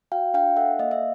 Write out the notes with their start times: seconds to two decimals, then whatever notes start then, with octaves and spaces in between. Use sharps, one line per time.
0.12 F#4 F5 G5
0.34 D4 F5 G5
0.56 A4 E5 F#5
0.79 A#3 D#5 F5
0.91 E5